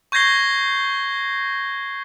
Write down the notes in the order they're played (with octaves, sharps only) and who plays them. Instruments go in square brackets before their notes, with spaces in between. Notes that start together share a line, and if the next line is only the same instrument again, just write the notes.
[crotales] C#6 G6 G#6 A#6 C7 G7